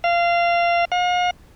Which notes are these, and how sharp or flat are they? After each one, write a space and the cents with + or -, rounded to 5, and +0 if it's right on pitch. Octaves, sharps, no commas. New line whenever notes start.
F5 -20
F5 +45